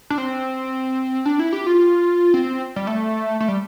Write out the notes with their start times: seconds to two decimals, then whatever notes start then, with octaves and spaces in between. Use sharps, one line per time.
0.10 D4
0.18 C4
1.26 D4
1.39 E4
1.53 G4
1.66 F4
2.34 C4
2.76 G3
2.87 A3
3.40 A3
3.48 G3